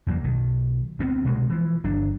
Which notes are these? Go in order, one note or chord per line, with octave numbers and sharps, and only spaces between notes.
E2 F#3 A#3
B1 D#3
D2 B3 C4
C2 B2 G#3 A#3
E3 F3
G1 F#3 D4